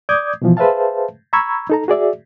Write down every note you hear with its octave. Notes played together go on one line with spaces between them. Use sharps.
D5 D6 D#6 G6 G#6
B2 E3 F3
G#4 B4 C5 E5 F5 A5
A#5 B5 C#6 E6 G#6
D#4 A4 A#5
F#4 G#4 D5 E5